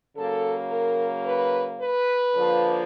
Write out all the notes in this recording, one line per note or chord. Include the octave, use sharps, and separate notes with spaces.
C#3 F#3 A#3 A4
A#4
B4
B4
D3 F3 A#3